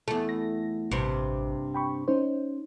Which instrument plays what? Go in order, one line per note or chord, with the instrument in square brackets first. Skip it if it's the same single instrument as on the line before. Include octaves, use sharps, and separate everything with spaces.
[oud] E2 A3
[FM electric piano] A#6
[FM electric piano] A1 [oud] G2 C3
[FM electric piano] G5 B5 C#6
C#4 D#4 C5